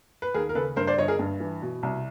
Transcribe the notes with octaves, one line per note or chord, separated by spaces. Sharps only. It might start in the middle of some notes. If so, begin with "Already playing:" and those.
B4
D#2 G#4 A#4
A#4
C#3 A4 B4
G2 A#4 C5
C5 D5
G1 C#5 D#5
G#4 A#4
G2
E3
B2
C2